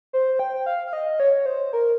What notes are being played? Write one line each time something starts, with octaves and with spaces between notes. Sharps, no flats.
C5
G5
F5
F5
D#5
C#5
C5
A#4